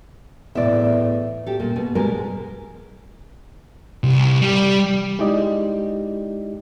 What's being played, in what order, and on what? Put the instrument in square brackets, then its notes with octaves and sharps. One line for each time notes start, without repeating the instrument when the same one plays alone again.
[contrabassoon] E2 [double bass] A2 [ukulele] D5 E5
[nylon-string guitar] G4 A4
A#2 G3
B2
B2 G3 G#3 A#4
[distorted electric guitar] C2
G3
[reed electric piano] G#3 D#4 E4 G4 D5 D#5